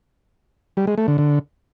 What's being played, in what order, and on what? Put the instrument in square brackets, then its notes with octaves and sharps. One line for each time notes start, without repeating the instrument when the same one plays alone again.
[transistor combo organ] G3
G#3
A3
D3
D3